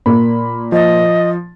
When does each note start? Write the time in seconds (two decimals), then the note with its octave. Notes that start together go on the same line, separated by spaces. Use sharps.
0.06 A#2 A#3 B5
0.72 F3 D#5 A6